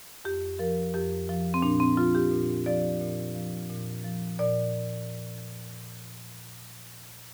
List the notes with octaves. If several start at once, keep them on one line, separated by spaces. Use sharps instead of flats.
F2 G4
F3 A#4
F2 G4
F3
C4
A#2 D4
C4
F3 F4
G4
A#2
F3 D5
A#2
F3
A#2
F3
A#2 D5